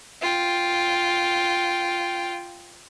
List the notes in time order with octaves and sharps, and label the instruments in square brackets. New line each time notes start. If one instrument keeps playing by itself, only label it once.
[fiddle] F4 G5